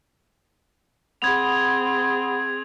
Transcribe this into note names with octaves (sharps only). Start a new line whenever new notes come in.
C4 G#4 F#5 B5 D#6 G#6 F7